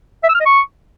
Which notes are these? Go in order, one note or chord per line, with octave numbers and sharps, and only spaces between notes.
E5
E6
F6
D#5
C#6